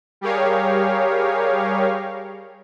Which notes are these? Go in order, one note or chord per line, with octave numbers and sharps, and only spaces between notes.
G3 G4 G#4 A#4 C#5 F5